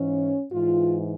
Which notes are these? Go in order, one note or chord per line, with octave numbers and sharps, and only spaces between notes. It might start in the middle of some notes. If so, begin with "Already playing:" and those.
Already playing: G#2 E3 C#4
G#2 E3 F4